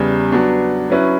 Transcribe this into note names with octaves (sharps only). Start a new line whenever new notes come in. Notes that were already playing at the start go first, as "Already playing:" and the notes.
Already playing: E2 C#3 G3
F#3 B3 D4
F#3 C#4 E4 B4